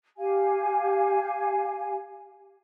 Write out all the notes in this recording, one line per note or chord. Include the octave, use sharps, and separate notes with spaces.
G4 F5 G#5